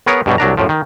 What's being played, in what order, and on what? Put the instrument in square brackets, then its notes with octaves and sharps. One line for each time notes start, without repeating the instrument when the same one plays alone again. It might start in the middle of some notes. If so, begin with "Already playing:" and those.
[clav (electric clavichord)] B3 G#4 A#4 C#5
G2 B2 F#3 G3
C2 F#3 D4 A#5
F#2 A2 F3
D#3